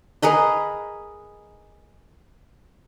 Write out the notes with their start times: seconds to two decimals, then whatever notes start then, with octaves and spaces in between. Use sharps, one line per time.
0.22 G#4 A#4 B4 D#5